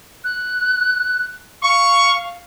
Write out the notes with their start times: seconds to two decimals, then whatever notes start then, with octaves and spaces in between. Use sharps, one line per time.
0.24 F#6
1.62 F5 C#6